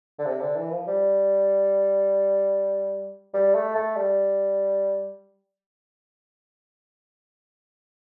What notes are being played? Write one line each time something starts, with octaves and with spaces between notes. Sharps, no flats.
D3
C3
D3
E3
F3
G3
G3
A3
A3
G3